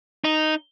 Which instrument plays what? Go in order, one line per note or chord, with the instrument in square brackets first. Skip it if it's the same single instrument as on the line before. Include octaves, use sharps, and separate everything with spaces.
[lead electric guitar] D#4